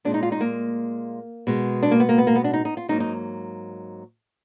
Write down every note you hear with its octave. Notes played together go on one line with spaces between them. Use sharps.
A#2 G#3 D4
D#4
F4
D#4
A#3
B2 G#3
D4
A#3
B3
A#3
B3
A#3
B3
D4
D#4
D#4
F4
G#2 F#3 A#3 D#4
D#4